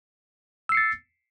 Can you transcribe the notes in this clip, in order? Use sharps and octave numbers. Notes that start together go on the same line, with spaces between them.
E6 A6 C7 C#7